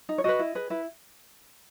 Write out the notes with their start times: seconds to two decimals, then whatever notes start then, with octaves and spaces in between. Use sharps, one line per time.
0.09 D#4
0.18 C#5
0.24 F#4 B4 D#5
0.39 E4
0.55 G#4 B4
0.70 E4 B4